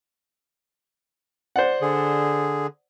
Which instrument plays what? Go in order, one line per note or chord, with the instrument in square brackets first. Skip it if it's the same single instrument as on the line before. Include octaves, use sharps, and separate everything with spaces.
[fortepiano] C5 D5 F#5
[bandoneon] D3 G#4